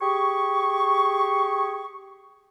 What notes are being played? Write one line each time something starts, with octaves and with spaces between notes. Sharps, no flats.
G4 G#4 C#6